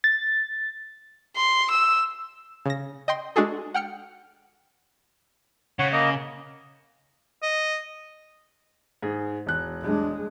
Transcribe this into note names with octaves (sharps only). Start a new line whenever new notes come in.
A6
C6
E6
C#3 A#6
D#5 G5 C6
G#3 D4 F#4 G#4 A4
F#5 G5 F6 C#7
C#3 C#5 F#5
A#3 D#5
D#5
G#2 G#4
E1 F#6
G#3 D4